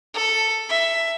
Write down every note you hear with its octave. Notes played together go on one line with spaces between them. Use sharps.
A4
E5